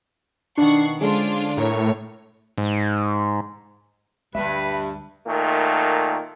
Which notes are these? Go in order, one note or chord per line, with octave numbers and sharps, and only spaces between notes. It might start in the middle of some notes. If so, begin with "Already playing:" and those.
B2 D#3 D4 F#5 C#6 C7
D3 G#3 C#4 D4 F4 C5
A2 A#4 C#5
G#2
D2 G2 G3 B4 E5
A#2 D#3 A3